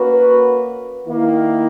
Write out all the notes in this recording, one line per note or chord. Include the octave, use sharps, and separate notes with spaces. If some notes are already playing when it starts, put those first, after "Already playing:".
Already playing: A#3 C#4 F#4 B4
D#3 A#3 E4